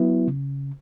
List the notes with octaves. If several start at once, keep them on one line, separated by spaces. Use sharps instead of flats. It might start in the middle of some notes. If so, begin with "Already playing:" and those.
Already playing: F#3 B3 E4
C#3